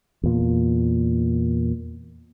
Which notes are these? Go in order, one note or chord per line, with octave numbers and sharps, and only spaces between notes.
E2 A#2